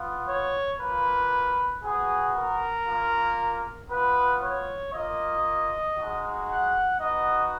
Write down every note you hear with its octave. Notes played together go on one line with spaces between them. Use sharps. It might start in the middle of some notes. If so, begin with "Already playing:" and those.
Already playing: B3 F4
C#5
A#3 F4 B4
B3 F#4 G#4
A#4
A#3 F4
B3 F4 B4
C#5
A#3 F4 D#5
G#3 D#4 F#4
F#5
B3 D#4 F#4 D#5